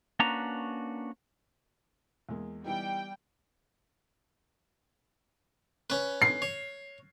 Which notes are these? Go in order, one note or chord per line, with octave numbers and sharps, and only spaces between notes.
A#3 C#4 D4 F#4 B4 A#5
E2 G#3 A#3
E3 G3 B3 D#4 G5
C#4 B4
C7
C#5